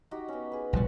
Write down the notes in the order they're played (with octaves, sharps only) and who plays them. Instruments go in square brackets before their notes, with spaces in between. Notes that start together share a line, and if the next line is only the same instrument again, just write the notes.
[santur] D#4 F#4 G4
B3 C#4
G#4 B4
[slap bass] A#1 B2 G3 [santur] C5 F#5